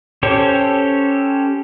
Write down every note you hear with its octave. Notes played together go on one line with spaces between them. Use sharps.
C#4 G4 A4 C5 C#5